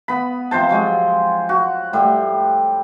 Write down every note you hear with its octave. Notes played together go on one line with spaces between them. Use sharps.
B3 B5
C3 F3 C5 A5
F3 F#3 G#3
F#4
A2 G3